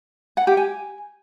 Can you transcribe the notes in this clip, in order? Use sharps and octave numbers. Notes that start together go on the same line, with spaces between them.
F#5
G4
G#5